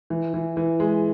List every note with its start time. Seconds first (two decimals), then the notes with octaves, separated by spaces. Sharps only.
0.10 E3
0.34 E3
0.57 E3
0.80 G#3